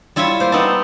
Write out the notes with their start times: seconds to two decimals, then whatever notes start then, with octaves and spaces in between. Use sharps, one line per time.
0.16 G3 E4 F4 C#5 E5
0.40 A#3 C5
0.52 B3 C4 D#4 A#4 E5 A5